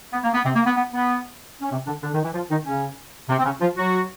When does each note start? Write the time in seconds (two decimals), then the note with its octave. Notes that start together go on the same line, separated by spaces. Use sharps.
0.13 B3
0.24 A#3
0.34 B3
0.44 C3 C4
0.56 A#3
0.66 B3
0.77 B3
0.93 B3
1.61 C#4
1.71 C3 C4
1.87 D3 D4
2.03 D3 D4
2.14 D#3 D#4
2.24 E3 E4
2.34 F3 F4
2.51 D#3 D#4
2.66 C#3 C#4
3.29 C3 C4
3.39 C4
3.45 C#3 C#4
3.61 F3 F4
3.77 F#3 F#4